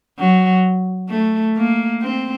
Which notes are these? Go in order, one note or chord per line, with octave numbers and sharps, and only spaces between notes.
F#3
A3
A#3
C4